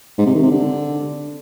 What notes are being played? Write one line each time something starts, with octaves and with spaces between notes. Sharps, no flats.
G#2
C3
D#3
C3
D3